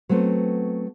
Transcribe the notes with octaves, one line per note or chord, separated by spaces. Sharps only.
F#3 A3 B3 C4